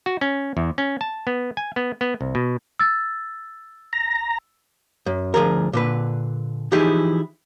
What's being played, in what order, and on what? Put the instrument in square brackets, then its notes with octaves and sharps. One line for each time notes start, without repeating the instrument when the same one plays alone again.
[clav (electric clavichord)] F#4
C#4
E2
C#4
A5
B3
G#5
B3
B3
C2
B2
[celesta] E6 A6
[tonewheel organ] A#5
[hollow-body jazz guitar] F#2
D2 F3 G#4 A#4
A#2 D3 B4
E3 F3 D#4 E4 G4 G#4